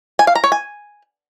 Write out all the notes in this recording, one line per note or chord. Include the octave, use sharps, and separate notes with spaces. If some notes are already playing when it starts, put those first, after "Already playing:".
G#5
F5
A#5
C#5
G#5